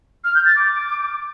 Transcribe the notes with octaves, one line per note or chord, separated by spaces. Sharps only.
F6
G6
A6
D6